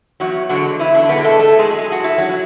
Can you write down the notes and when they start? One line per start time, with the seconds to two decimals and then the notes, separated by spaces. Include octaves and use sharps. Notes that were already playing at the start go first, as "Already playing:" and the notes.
0.20 E2 F#3 F#4
0.49 D3 F#3 G#3 F#4
0.79 E2 E3 E4
0.95 D3 D4
1.09 B2 D3 G#3 B3
1.24 A3 A4
1.39 A2 A3 A4
1.59 G#3 G#4
1.70 F#3
1.79 G#4
1.92 F#4
1.99 A2
2.04 E4
2.18 F#3 F#4
2.29 F#3